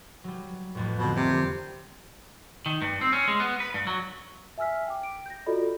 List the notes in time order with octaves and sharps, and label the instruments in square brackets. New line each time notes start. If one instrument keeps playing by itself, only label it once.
[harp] F#3 G3
A1 F2 A2
[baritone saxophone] B2 [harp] D3 C4
[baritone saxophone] C3 [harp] A#3
[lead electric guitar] D#3
G2
C4
C#4
G#3
B3
B4
G2
F#3
[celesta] E5 G#5 E6 F6 B6
G5 D6
D7
G6 A#6
F4 F#4 A4 D5 D#5 B5